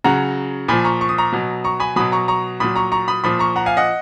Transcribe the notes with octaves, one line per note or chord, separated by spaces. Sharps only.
C#3 F#3 F#5 A#5
A#2 F3 G#5 B5
A#5 C#6
C#6
D#6
A#5 C#6
B2 F#3
A#5 C#6
G#5 B5
B2 F#3 B5 D#6
A#5 C#6
A#5 C#6
A#2 F#3 B5 D#6
A#5 C#6
A#5 C#6
B5 D#6
A#2 F3 B5 D#6
A#5 C#6
F#5 A#5
F5 G#5
D#5 F#5